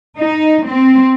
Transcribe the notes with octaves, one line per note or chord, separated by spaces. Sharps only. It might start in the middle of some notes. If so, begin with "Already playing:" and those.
D#4
C4